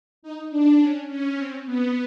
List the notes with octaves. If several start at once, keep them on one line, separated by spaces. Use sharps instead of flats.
D#4
D4
C#4
C#4
C4
B3